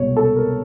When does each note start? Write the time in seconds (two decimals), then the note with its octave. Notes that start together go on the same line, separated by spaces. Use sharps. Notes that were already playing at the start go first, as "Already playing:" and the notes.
Already playing: C2 B2 G#3 C#5
0.17 A4
0.36 A#4